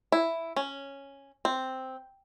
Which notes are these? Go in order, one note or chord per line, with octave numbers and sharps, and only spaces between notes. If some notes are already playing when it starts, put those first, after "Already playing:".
E4
C#4
C4